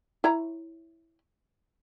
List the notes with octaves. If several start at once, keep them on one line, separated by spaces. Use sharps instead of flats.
E4 C#5 A#5